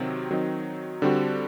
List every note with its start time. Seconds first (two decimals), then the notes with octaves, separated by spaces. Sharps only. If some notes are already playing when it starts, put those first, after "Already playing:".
Already playing: C3 D#3 F#3 C4
0.31 D#3 F#3 C4 D#4
1.02 D3 G3 C4 F#4